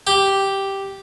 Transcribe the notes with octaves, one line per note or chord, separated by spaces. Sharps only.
G4